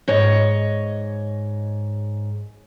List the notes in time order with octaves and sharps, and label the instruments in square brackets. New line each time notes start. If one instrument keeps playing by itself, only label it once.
[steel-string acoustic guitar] G#2 C#5 D#5